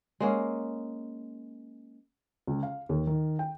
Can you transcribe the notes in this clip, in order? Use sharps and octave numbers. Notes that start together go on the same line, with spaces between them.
G#3 A#3 C#4
C#2
F5
D#2
D#3
G5